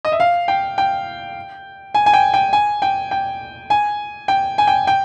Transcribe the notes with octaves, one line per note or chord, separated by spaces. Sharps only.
D#5
E5
F5
G5
G5
G#5
G#5
G5
G5
G#5
G5
G5
G#5
G5
G#5
G5
G5